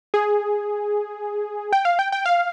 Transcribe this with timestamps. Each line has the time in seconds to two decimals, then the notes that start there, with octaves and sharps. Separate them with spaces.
0.14 G#4
1.73 G5
1.85 F5
1.99 G5
2.12 G5
2.26 F5